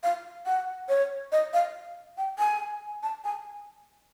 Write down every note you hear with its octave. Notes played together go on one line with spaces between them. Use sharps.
F5
F#5
C#5
D#5
F5
G5
G#5
A5
G#5